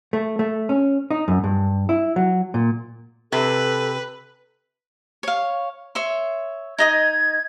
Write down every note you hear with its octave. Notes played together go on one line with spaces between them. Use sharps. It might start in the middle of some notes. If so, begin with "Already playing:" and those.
A3
A3
C#4
D#4
F#2
G2
E4
F#3
A#2
C3 A4 B4
C#5 F5
C#5 E5 C6
D#4 D#5 D#6 G#6